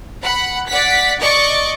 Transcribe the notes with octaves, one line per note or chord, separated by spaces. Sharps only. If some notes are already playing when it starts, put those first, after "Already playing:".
F#5 B5
D5 F#5 B6
D5 D#5 C#6 D6